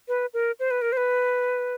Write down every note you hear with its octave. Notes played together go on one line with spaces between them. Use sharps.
B4
A#4
C5
B4
A#4
C5
B4